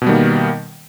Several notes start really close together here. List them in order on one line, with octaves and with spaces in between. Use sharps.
B2 B3 G3 D#3 A#3